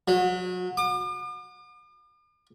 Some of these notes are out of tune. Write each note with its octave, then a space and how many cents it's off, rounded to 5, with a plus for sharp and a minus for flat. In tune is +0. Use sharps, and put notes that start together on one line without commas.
F#3 -30
D6 +45